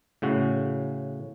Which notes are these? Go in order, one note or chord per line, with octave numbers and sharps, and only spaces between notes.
A2 C#3 F#4